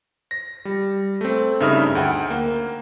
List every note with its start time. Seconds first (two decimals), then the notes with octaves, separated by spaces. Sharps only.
0.31 A#6
0.65 G3
1.21 A3 C4
1.60 G2 C#3 D#4 E5 D#6 F6
1.95 D2 F#5 G5
2.30 A#3